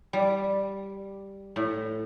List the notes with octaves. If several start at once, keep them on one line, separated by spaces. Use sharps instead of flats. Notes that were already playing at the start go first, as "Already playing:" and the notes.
G3
A2